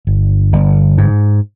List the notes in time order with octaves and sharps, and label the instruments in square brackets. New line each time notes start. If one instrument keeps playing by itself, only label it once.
[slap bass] G1
G1
G#2